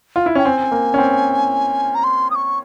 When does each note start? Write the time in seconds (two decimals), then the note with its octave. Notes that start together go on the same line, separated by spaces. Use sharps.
0.16 F4
0.26 E4
0.35 C#4 G5
0.45 C4 G#5
0.72 A#3
0.94 C#4
0.98 C4
1.95 A#5
2.04 C6
2.31 D#6
2.35 C#6